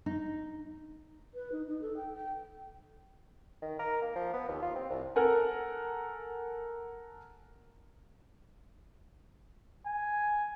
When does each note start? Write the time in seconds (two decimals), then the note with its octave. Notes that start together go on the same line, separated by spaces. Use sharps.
0.06 D#4
1.35 B4
1.52 D#4
1.67 D#4
1.82 A4
1.97 G5
2.13 G5
3.62 D#3
3.79 A#4
4.02 A#3
4.16 F3
4.33 B3
4.48 D#2
4.62 F4
4.76 C4
4.90 C2
5.16 A4 A#4 F#5 G#5
9.87 G#5